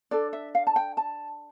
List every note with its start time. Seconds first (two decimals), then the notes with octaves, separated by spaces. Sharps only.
0.11 D4 A4 D5
0.33 E5
0.55 F5
0.67 A5
0.76 G5
0.97 A5